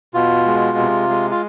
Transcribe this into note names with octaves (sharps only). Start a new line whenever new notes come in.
B2 F4
G#3
C3
G#3
F4